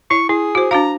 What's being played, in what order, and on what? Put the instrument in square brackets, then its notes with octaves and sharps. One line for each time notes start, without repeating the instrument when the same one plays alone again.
[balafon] E4 [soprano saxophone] C#6
[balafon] E4 [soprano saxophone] G#4
[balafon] F#4 C5
[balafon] D4 F#4 F5 [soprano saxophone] A#5